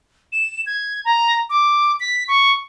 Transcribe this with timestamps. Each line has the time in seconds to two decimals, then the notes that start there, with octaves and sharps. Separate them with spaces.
0.32 E7
0.66 G#6
1.05 A#5
1.50 D6
2.00 B6
2.28 C#6